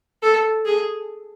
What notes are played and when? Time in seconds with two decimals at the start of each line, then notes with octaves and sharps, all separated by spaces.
0.22 A4
0.66 G#4